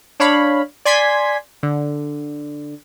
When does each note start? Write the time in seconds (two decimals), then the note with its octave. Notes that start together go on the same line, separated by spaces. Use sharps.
0.20 D4 C#5 F5 B5
0.85 D5 G#5 C6 G#6 B6
1.63 D3